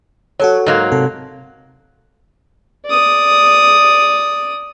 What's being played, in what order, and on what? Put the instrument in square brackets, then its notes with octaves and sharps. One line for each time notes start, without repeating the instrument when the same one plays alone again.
[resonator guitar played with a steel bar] F#3 [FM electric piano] F#4 A4 C#5
[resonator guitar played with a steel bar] G#2 F#3 A#3
[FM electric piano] C3 A4
[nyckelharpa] D5 D#6